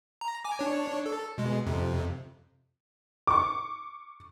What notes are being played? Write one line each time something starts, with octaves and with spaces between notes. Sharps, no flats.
A#5
G#5 D6
D4 C#5
A4
B2 G#3
F2 C3
C#6 D6